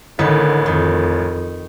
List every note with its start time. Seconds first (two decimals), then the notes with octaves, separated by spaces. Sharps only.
0.19 A1 D3 D#3 B4
0.66 F2 D#3